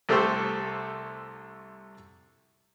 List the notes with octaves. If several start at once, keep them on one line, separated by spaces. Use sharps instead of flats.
C2 A3 G4 A4 C5 C#6